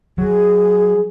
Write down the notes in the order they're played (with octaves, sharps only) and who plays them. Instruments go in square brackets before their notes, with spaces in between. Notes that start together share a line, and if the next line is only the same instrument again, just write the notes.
[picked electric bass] F#3 [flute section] G#4